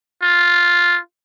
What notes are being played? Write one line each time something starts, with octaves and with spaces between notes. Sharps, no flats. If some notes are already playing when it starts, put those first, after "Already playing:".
F4